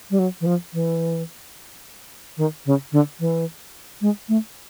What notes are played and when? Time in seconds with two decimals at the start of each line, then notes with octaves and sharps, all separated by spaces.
0.11 G3
0.19 F#3
0.41 E3
0.46 F3
0.73 E3
2.37 D#3
2.66 C#3
2.92 D3
3.20 E3
4.01 G#3
4.29 A3